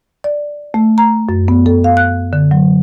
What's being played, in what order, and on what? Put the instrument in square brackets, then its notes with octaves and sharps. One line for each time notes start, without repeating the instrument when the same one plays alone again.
[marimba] D5
A3
A#5
F#2
B3
A4
F5
F#6
D3
F#3